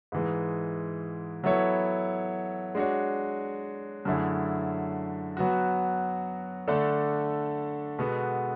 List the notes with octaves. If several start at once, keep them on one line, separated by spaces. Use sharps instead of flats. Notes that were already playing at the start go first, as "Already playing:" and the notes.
G#2 E3 G#3
F#3 B3 E4 A4 C#5
G#3 D4 F#4 C#5
F#2 D3 A3 E4 G#4
F#3 B3 F#4
D3 A3 D4 A4
B2 G#3 B3 F#4 A4